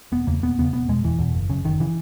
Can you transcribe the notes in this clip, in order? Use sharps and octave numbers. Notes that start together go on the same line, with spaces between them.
E1 B3
E2 C#3 A#3
E1 B3
E2 C#3 B3
E1 B3
E2 B2 G#3
E1 E3
E2 B2
F#1
F#2 C#3
F#1 D#3
C#3 E3